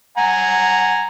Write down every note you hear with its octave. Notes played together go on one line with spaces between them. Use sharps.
F#5 G#5 A#5